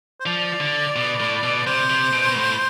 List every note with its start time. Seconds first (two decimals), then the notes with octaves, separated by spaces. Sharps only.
0.21 C5
0.26 F3 D5
0.60 D3
0.96 B2
1.20 A2
1.43 B2
1.66 C3 C5
1.90 C3
2.13 B2
2.29 B2
2.36 A2